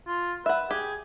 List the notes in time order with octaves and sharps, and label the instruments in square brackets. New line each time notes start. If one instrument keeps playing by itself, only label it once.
[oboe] F4
[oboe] B4 [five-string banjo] E5 F#5
[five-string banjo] G4 [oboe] G#4